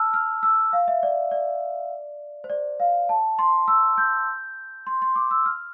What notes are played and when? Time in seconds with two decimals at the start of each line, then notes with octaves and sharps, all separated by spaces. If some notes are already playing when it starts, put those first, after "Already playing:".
Already playing: A5 E6 F6
0.14 F6
0.43 E6
0.73 F5
0.88 E5
1.03 D5
1.31 D5
2.44 C5
2.50 D5
2.80 F5
3.09 A5
3.39 C6
3.68 E6
3.98 G6
4.87 C6
5.02 C6
5.16 D6
5.31 E6
5.46 F6